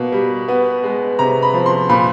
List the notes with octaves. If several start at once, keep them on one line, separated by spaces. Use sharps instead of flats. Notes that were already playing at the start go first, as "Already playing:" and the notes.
Already playing: B2 A#3
G3
B3
G#3
C3 A#5
B5
F3
C6
A#2 B5